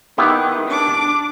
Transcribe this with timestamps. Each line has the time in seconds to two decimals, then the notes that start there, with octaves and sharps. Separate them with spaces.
0.18 D#3 B3 E4 G4
0.69 D4 D6